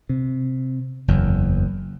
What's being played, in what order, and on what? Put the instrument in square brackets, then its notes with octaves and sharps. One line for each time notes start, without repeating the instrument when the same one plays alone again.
[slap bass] C3
F#1 E2